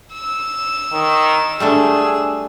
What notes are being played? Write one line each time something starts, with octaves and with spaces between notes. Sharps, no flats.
E6
D#3
G3 A3 D4 G#4